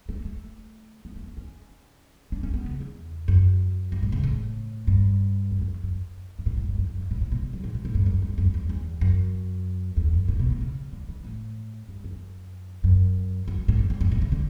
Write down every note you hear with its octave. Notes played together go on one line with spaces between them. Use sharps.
A3
A3
B3
A3
B3
C#4
D4
C#4
B3
C#3
E2
F#2
G2
A2
C#3
A2
G2
F#2
F#2
F#2
G2
A2
A2
G2
F#2
F#2
G2
A2
A2
B2
G3
F#3
A2
B2
A2
G2
F#2
G2
F#2
E2
E2
F#2
E2
F#2
A2
B2
A2
C#3
D3
E3
A2
G2
F#2
F#2
F#2
G2
A2
F#2
E2
G2
A2
C#3
D3